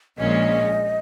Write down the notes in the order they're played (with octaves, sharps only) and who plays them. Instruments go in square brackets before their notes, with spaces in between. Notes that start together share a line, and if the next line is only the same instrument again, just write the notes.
[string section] A#1 A#2 G#3 C#4 [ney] D#5